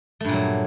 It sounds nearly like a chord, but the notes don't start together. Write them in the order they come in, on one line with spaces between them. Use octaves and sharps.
A3 G2 A#2 F#3